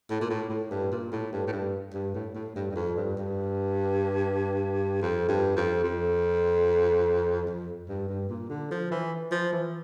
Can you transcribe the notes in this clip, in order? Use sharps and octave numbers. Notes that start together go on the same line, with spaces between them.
A2
A#2
A2
A2
G2
A#2
A2
G2
A2
G2
G2
A2
A2
G2
G2
F2
G2
G2
F2
G2
F2
F2
F2
G2
G2
A#2
D3
F3
E3
F3
E3